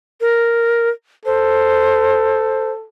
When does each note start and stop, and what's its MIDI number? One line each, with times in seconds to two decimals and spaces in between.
0.21 0.89 70
1.25 2.86 69
1.25 2.71 72